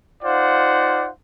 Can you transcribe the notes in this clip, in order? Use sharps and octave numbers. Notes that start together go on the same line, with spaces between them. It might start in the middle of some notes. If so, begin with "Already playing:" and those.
D#4 F4 C5 D5 F5 F#5